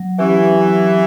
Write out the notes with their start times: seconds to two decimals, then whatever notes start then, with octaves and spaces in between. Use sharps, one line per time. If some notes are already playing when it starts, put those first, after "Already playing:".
Already playing: F#3
0.19 E3 C#4 G4
0.52 F#3